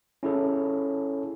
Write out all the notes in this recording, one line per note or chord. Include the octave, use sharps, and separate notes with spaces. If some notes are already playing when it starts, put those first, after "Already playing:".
C#4 E4 G#4 A4 C#5